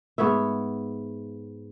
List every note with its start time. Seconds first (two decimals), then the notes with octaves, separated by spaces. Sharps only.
0.18 G#2 B3 C#5 E5